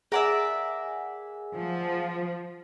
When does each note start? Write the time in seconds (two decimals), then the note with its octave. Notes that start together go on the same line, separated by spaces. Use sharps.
0.12 G#4 A#4 D5 E5 F#5 G#5
1.56 F3